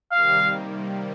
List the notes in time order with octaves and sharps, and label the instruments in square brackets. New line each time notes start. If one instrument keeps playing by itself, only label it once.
[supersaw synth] C3 D#3 G3 A#3 [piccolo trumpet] F5